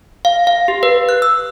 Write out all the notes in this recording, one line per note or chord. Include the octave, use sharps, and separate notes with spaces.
F5
F5
G4
B4
F#6
E6